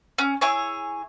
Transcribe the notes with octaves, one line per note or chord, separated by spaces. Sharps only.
C#4
E4 G#4 C#5